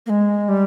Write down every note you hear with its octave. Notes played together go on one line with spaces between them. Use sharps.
A#3
G#3
G3